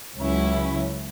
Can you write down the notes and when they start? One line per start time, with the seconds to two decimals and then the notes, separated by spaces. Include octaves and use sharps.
0.17 C#2 C#3 F#3 C#4 E4